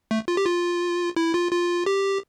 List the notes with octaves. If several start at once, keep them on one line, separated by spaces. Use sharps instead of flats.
A3
F4
G4
F4
E4
F4
F4
G4